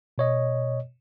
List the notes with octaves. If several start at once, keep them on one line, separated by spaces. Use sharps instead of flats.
B2 C#5 D#5